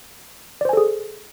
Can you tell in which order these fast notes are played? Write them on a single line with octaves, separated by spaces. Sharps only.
D5 C5 G#5 A4 G#4